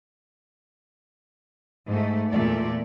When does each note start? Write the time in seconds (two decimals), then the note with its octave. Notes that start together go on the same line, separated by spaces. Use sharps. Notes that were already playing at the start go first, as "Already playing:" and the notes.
1.87 G#2 A3
2.31 E2 A#2 A3 D5